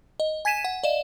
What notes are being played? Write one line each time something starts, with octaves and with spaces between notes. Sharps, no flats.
D#5
G#5 G#6 B6 D#7 E7
F#5
D5 D#5 F5 E7